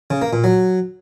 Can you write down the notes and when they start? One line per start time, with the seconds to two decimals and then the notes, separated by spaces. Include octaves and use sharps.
0.10 C#3
0.22 A#3
0.33 A#2
0.44 F#3